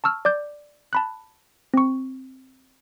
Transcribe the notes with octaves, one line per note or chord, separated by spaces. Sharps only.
A5 C#6 E6 F6
D5 D6 G6
A5 B5 F#6
C4 C#6